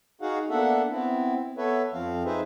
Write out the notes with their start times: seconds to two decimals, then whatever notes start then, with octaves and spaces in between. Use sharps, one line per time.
0.21 D#4 F#4 G#4 F5 F#5
0.50 A#3 B3 D4 A4 E5 F#5
0.90 B3 C4 E4
1.57 B3 A4 B4 C#5 E5
1.93 F2 F3 C4 F5
2.25 D#4 G#4 B4 C5 E5